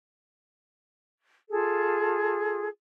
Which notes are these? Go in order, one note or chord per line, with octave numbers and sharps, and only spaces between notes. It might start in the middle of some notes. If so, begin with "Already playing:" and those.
F4 G#4 A4